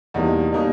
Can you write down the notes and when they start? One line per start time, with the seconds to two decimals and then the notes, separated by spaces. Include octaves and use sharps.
0.14 E2 B2 G3 A#3 D#4
0.52 B2 G3 A#3 D#4